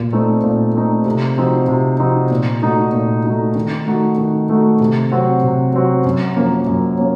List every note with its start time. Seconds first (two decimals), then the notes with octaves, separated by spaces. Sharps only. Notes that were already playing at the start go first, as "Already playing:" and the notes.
Already playing: A#2
0.13 A3 C4 D#4
0.43 A#2
0.75 A3 C4 D#4
1.06 C3
1.37 F3 C4 D#4 F#4
1.68 C3
1.99 F3 C4 D#4 F#4
2.31 A#2
2.62 A3 D#4 F#4
2.93 A#2
3.24 A3 D#4 F#4
3.55 D#3
3.86 A3 D#4 F#4
4.18 D#3
4.49 A3 D#4 F#4
4.80 C3
5.11 F#3 C4 F#4
5.43 C3
5.73 F#3 C4 F#4
6.04 F#2
6.36 F3 A#3 C#4
6.67 F#2
6.98 A#3 C#4